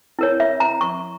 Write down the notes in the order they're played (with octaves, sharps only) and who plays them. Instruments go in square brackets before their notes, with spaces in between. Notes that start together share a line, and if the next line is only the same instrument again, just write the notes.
[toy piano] E4 A#4 C#5
E5
A#5
C#6